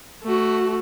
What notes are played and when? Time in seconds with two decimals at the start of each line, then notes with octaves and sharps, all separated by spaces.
0.24 A3 F#4